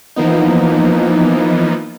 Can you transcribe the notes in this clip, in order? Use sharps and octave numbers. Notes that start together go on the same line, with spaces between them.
E3 F3 A#3 B3 D#4